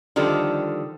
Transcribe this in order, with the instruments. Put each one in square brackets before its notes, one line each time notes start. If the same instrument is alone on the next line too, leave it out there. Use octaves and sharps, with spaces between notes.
[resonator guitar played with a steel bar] D3 D#3 F3 G3 A4